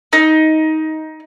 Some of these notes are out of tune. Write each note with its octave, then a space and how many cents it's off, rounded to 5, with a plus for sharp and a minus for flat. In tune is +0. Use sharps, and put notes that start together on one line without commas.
D#4 +15